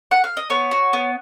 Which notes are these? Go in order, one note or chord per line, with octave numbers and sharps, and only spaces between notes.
F#5
F5
D#5
B3 C#5
F#4
B3